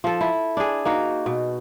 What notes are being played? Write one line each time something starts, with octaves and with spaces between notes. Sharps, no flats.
F3 A4
E4
D4 G#4
A#3 D#4 F#4
B2